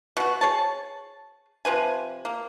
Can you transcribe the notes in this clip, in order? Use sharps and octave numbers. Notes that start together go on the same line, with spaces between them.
B2 F#4
G#4 C#5 A5
C3 F3 B4 G#5
A#3